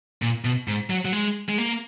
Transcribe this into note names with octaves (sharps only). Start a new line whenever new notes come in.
A#2
B2
G#2
F#3
F#3
G#3
G#3
A#3